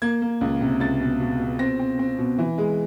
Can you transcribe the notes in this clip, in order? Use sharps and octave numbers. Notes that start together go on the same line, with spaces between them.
A#3 G#6
A#3
C#2
C3
C#2 A6
B2
B2
B2
C4 A#6
C4
C4
B2
E3
G#3